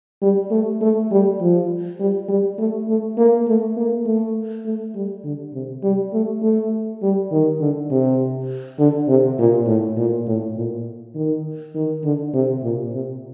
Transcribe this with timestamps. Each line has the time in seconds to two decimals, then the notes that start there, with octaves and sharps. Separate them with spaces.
0.22 G3
0.51 A3
0.81 A3
1.11 G3
1.40 F3
2.00 G3
2.28 G3
2.58 A3
2.88 A3
3.17 A#3
3.47 A3
3.76 A#3
4.06 A3
4.65 A3
4.95 G3
5.24 D3
5.53 C3
5.83 G3
6.13 A3
6.42 A3
7.02 G3
7.31 D#3
7.61 D3
7.91 C3
8.79 D3
9.08 C3
9.38 A#2
9.67 A2
9.97 A#2
10.27 A2
10.56 A#2
11.15 D#3
11.75 D#3
12.04 D3
12.34 C3
12.62 A#2
12.93 C3